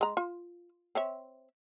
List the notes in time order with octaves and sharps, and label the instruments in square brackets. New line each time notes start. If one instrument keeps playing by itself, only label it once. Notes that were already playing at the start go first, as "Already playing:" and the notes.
[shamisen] G#3 A#5
F4
C4 C#5 E5